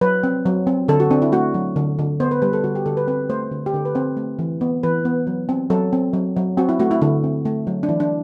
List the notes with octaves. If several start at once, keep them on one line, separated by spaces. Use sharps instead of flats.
F#3 B4
C4
F#3
C4
D3 A4
F#4
C4 D4
E4
A3 F#4
F#3
D3
D3
B3 C5
B4
G3 B4
A4
D3 F#4
G4
D3 A4
B4
C4 B4
A3 C5
D3
G4
D3 A4
B4
C4 C5
A3
E3
B3
E3 B4
B3
F#3
C4
F#3 A4
C4
F#3
F#3
C4 F#4
E4
A3 F#4
E4
D3 E4
C4
A3
F#3
D4
E3 E4
D4